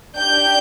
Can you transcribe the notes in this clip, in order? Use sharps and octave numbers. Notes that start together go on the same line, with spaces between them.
D4 G4 G6